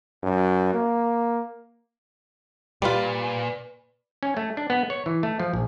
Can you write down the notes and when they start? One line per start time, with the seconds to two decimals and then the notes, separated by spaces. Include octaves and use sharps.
0.23 F#2
0.74 A#3
2.82 A#2 G3 F4 B4 D5
4.23 C#4
4.37 A3
4.57 D4
4.70 B3
4.90 C#5
5.06 E3
5.23 A3
5.40 F3
5.53 A#1